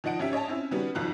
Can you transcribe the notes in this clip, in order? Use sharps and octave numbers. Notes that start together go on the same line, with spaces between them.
D#3 F3 D#5 F#5 D7
G#1 C#4 G4 E5
C#5 D#5 G#5 A5
C4 C#4 E4
D#3 G3 B3 C#4 F#4
B1 F2 D#3 F3 F4 F#6